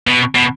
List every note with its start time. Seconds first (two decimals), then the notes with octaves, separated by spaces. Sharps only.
0.08 B2
0.35 B2